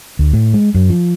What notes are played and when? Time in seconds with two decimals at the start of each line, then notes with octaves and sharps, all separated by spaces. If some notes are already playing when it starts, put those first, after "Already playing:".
0.19 D2
0.33 A2
0.54 G#3
0.75 F#2
0.90 F3